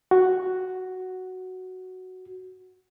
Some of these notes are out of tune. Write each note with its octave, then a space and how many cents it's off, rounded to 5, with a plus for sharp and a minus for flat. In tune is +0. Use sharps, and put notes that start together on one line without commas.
F#4 +5